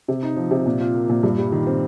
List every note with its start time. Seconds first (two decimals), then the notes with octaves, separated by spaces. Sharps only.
0.08 C3
0.23 D#4
0.36 F3
0.51 C3
0.66 A#2
0.81 F4
0.94 A#3
1.10 A#2
1.23 G2
1.38 G3
1.52 D#3
1.67 C4